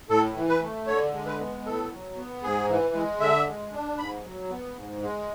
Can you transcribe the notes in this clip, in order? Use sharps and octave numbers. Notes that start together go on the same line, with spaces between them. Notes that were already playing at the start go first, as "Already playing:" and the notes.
A2 A4
E3
B4
A3
D3 C#5
G#3
B4
B3
A2 A4
F#3
B3
G#2 G#4
E3
G#3
D3 E5
G#3
D4
G#2 B5
F#3
B3
G#2
G#3